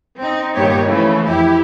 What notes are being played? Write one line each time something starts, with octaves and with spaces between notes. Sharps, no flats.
C4 D#4
G2 A#2 D#3 B3 G4 C#5
C#3 E3 F3 A3
F2 E4 G4